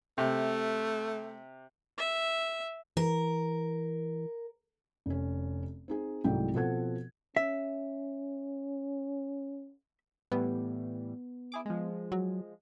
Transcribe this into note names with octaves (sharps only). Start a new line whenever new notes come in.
C3 A3
E5
E3 A#4
F1 C#4
C4 D#4 G#4
C2 G#2 F#3 A3 E4 G5
B2 F3 C4 A4 F#5 G#6
C#4 E5
A2 E3 G3 B3
E4 G#4 D6
F3 G#3
F#3